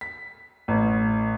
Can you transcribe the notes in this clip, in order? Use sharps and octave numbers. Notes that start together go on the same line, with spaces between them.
B6
A1